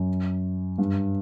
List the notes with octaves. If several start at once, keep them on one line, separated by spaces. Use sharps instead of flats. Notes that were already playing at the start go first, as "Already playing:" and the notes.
Already playing: F#2
G2